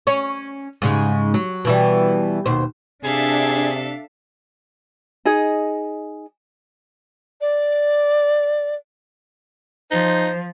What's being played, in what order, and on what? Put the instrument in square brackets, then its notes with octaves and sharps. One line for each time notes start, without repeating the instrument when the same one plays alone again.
[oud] C#4 C#5
G#2 C#3 G#3
F#3
B2 E3 G3
D#2 B2 C5
[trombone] C3 [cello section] D4 E5 [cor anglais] G#4 [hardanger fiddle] A4 F5
[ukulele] D#4 G#4 D#5
[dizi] D5
[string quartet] F3 [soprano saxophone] D#4 [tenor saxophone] C5